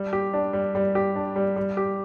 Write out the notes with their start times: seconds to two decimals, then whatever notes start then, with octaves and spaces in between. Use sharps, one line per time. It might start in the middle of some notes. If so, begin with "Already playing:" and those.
Already playing: G3
0.13 G4
0.34 D4
0.53 G3
0.75 G3
0.95 G4
1.16 D4
1.36 G3
1.56 G3
1.77 G4